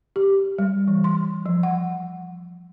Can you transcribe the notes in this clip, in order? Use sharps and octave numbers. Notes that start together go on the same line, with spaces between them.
G4
G3
E3
C6
F3
F#5